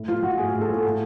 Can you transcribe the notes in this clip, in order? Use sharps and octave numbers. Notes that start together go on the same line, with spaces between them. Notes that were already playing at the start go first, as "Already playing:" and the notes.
Already playing: A2
F3 F4
F3 F#4
A2 G#4
A2
A4
F3
A2